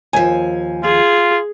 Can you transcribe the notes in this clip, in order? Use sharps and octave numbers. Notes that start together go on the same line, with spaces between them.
D#2 F3 G#5
F4 G#4